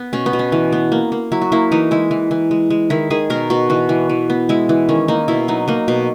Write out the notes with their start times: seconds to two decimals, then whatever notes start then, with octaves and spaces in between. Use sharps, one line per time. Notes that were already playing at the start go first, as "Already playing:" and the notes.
Already playing: B3
0.13 B2 C#4
0.26 B3
0.33 B2
0.39 C#4
0.52 E3
0.72 B3
0.92 A#3
1.12 A#3
1.32 F#3 E4
1.42 F#4
1.52 A#3 E4
1.72 E3 D#4
1.91 G#3 E4
2.11 E3
2.31 E3
2.51 G#3
2.70 G#3
2.90 D#3 E4
3.10 D#3 G#4
3.30 B2 A#4
3.50 B2 F#4
3.70 E3 F#4
3.89 E3
4.09 E3
4.30 B3
4.49 G#3 E4
4.69 E3
4.89 D#3 C#4
5.08 A#3 D#4
5.28 B2 E4
5.48 F#3 D#4
5.68 A#3 D#4
5.88 B2